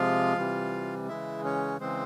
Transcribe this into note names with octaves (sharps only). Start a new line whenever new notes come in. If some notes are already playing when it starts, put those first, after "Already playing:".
Already playing: C3 F3 G#3 F4 F5
C3 E3 G3
C#3 E3 G#3 E4 E5
C#4 C#5
C#3 E3 G#3 C4 C5